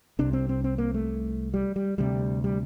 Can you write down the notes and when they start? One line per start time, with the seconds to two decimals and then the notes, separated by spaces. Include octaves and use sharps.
0.19 C2 C3 D4
0.33 C4
0.49 C4
0.64 C4
0.78 A#3
0.94 A3
1.54 G3
1.76 G3
1.98 D2 C3 G3
2.44 G3